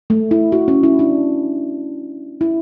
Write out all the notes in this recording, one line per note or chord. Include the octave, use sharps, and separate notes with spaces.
A3
E4
F#4
C#4
E4
D4
E4